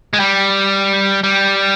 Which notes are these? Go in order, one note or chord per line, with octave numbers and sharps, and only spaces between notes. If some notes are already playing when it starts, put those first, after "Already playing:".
G#3
G3
G3